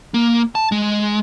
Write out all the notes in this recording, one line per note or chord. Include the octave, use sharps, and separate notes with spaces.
A#3
A5
G#3